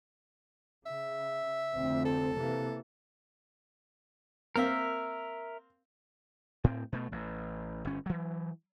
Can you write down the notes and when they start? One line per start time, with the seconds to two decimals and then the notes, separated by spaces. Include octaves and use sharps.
0.86 C#3 E5
1.74 F1 D2 C4
2.05 A4
2.37 C3 E3 A#3
4.56 A#3 C4 A#4 E5 F5
6.64 A2 C4
6.93 B2 A3
7.12 A1
7.85 G1 C#4
8.06 E3 F#3